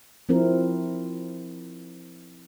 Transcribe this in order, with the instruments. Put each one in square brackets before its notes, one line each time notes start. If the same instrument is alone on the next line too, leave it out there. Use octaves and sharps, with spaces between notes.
[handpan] F3 C4 E4 A#4